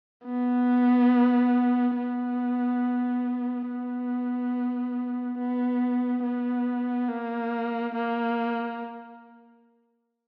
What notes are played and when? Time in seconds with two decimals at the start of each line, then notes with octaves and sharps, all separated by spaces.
0.25 B3
1.96 B3
3.68 B3
5.38 B3
6.23 B3
7.09 A#3
7.95 A#3